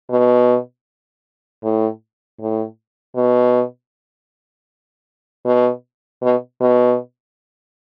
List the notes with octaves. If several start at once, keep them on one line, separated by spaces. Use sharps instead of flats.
B2
A2
A2
B2
B2
B2
B2